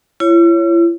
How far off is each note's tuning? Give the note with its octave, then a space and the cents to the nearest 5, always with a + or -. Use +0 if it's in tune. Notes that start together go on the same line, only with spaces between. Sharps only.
E4 +45 C#5 +0